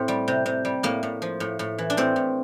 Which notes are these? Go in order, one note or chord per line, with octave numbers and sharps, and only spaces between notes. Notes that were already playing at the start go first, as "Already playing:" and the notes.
Already playing: A2 C4
G3
C3
C3
G3
A2 A#3
A2
F3
A2
A2
E3
D4
A2 C4
A2